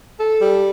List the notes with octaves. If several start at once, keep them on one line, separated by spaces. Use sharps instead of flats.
A4
G3